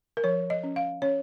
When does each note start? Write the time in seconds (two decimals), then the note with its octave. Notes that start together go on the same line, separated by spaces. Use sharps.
0.17 A#4
0.24 F3 C#5
0.50 D#5
0.63 C#4
0.76 F5
1.02 C#4 C#5